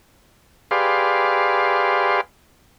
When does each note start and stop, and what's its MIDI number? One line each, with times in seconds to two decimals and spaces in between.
0.71 2.21 67
0.71 2.21 68
0.71 2.21 71
0.71 2.21 74
0.71 2.21 77
0.71 2.21 84